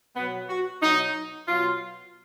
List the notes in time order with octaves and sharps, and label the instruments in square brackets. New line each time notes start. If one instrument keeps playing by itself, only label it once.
[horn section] B2 F#3 B3
F#4
B2 F#3 D#4
B2 F#3 F4